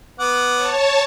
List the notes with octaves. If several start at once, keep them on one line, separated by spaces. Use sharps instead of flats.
B3 F#5 D6
C#5 A5